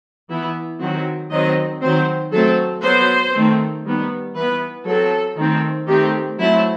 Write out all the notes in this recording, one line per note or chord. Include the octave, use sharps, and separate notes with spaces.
E3 B3 E4
D#3 F#3 C4 F#4
D#3 F#3 C4 D#5
D#3 F#3 C4 C5
F#3 A3 C4 A4
F#3 B3 C5
D#3 A3 C4
D#3 G3 B3
E3 B3 B4
F#3 C4 A4
D#3 A3 C4
D#3 A3 C4 G4
F#3 A3 C4 E4